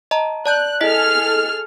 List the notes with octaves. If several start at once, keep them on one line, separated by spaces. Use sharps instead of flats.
D#5 A5 A#5
D5 A5 F#6 G6
E4 G#4 A4 D#5 F6 B6